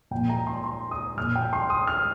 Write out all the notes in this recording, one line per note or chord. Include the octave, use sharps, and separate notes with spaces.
A#2 F3 A#3 G5
A#5
C6
C6
D#6
A#2 A#3 F6
G5
C6
D#6
F6